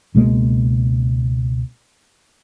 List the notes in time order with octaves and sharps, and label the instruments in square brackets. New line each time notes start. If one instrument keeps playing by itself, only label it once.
[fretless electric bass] C#2 B2 G#3 A#3